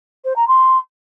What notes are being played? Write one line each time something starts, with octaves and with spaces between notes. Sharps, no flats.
C5
A#5
C6